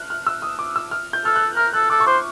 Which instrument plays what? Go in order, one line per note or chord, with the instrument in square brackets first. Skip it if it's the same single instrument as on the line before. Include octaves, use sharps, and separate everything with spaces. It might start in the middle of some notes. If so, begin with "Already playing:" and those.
Already playing: [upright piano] F6 F#6
F6
E6
D#6
D6
E6
F6
G6
[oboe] A4 [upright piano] F6
[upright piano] F#6
[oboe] A#4 [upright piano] F6
[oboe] A4 [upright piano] F#6
[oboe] A4 [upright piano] D6
[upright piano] C#6
[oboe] C5 [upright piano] D6